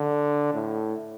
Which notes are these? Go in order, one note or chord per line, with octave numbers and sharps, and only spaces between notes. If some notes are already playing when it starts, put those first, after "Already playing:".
Already playing: D3
A2